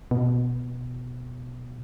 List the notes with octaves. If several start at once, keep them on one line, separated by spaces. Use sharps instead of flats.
B2